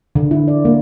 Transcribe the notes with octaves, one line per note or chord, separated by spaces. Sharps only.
D3
E4
D5
A#3